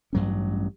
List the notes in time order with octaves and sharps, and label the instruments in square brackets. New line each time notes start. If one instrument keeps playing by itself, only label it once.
[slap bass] A1 G2 F#3 C#4